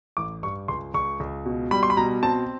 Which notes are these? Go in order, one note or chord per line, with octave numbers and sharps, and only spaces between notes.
A1 D6
G2 C#6
C#2 C6
C#2 C#6
C#2
B2
G3 B5
C6
B5
B2 A#5
C4 A5